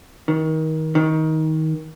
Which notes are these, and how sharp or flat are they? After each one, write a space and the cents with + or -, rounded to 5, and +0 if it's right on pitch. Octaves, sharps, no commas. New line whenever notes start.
D#3 +25
D#3 +20